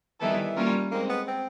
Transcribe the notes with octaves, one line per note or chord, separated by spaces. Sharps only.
D#3 E3 G3 B3 E4 A4
G3 A#3 C#4 F4 A#4
G#3 A#3 C4 D#4
B3
C4